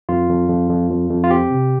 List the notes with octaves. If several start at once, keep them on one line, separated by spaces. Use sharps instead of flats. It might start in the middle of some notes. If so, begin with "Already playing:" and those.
F2 F4
F2
F2
F2
F2
F2
F4
C4 G4
C3